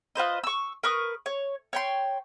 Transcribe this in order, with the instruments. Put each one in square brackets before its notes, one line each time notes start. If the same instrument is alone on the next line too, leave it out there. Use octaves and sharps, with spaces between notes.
[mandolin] F4 B4 C5 D#5
C#6 E6
A#4 B4 C#6 D#6
C#5
C#5 G5 C6